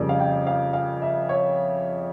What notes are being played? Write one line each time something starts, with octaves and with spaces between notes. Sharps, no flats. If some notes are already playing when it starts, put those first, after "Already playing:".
Already playing: F2 C#3 G3 A#3 D5
F5
G5
F5
F5
E5
C#5